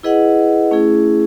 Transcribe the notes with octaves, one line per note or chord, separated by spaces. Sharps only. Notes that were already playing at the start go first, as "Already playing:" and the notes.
E4 G#4 B4 D#5 F#5
A3 C#4 E4 G#4